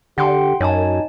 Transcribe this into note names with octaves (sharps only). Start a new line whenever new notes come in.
D3 G4 F#5 G5 C6
F#2 D#4 C#5 G#5 A5